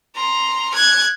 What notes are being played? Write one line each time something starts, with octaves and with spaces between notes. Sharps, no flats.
A#5 C6
F#6 G#6